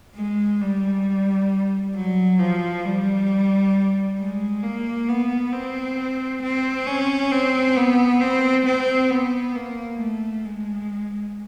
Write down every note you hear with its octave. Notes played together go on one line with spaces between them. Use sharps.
G#3
G3
F#3
F3
G3
G#3
A#3
B3
C4
C4
C#4
C4
B3
C4
C4
B3
A#3
A3
G#3